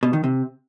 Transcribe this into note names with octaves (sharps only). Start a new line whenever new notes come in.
B2
D#3
C3